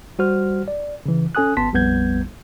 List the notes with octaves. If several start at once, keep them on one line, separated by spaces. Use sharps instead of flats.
G3 F#4 C5 F6
D5
C#3 E3
C#4 A4 G#5 D#6 F#6
G#1 B3 A5 C6 B6
A#1 F2 G3 B3 G6 G#6